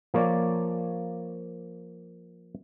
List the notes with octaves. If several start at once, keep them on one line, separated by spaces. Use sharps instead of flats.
F3 A#3 C#5 D5